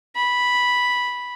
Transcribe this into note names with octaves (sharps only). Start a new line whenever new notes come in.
B5